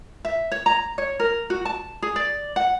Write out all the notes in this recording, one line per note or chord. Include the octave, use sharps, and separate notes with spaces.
E5
C#5
A#5
C#5
A#4
F#4
A5
G#4
D5
F#5